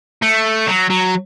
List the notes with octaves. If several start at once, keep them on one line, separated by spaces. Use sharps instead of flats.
A3
F#3
F#3